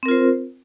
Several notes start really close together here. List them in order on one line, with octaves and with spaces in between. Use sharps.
C4 A#4 F4 C5